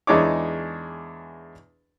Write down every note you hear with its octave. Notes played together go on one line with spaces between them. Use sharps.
E2 G#3 D4 D#4 C#5 D6